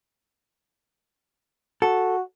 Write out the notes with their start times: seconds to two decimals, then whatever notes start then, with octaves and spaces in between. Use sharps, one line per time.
1.82 F#4 A4